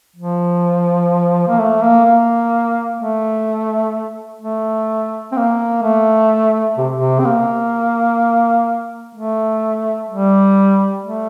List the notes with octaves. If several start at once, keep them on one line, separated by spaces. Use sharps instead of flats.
F3
A#3
A3
A#3
A#3
A3
A3
C4
A#3
A3
C3
C3
C4
A#3
A3
G3
A3